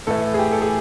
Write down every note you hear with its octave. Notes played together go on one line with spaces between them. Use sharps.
A2 E3 A3 A4
G#4
G4
A4
G#4